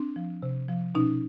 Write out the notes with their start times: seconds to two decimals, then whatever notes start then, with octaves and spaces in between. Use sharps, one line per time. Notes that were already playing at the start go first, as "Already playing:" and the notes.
Already playing: C4 D4
0.16 F3
0.42 C3
0.68 F3
0.95 B2 C#4 D#4